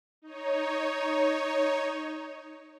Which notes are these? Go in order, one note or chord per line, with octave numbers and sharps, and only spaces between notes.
D#4 C#5